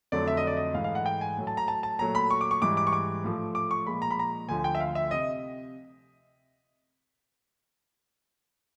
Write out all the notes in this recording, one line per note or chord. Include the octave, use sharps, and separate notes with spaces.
F2 D3 F#3 A3 D5
E5
D#5
D5
D#5
G#2 E3 A3 F5
F5
F#5
G5
G#5
A2 F#3 A3
A5
A#5
A5
A5
A#2 F#3 A3 A#5
B5
C#6
D6
C#6
G#2 E3 G3 D6
D6
C#6
D6
A2 F3 A3
D6
C#6
A#2 F3 G#3 B5
A#5
B5
A#5
D2 D3 F3 A3 G#5
G5
E5
F5
E5
C3 D#5